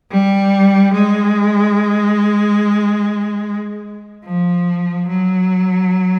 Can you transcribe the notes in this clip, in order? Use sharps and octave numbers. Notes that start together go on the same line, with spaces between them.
G3
G#3
F3
F#3